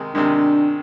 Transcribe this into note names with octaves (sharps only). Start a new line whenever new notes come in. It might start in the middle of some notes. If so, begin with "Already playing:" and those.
Already playing: C3 D#3 G#3
C3 D#3 G#3 D4